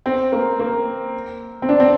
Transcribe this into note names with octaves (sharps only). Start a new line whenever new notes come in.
C4
A#3
A#3
C4
D4
C4